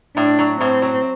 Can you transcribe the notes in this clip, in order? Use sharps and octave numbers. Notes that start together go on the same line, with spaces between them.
A2 D4
F#3
A2 C4
F#3